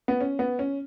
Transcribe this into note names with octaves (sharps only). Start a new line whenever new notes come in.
B3
C#4
B3
C#4